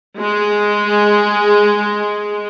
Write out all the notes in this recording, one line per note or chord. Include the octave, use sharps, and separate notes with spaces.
G#3